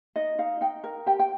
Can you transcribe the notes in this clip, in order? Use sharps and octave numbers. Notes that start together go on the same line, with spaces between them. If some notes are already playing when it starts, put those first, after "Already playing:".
D#4 D#5
D#4 F5
D#4 G5
A#4
G4 G5
G5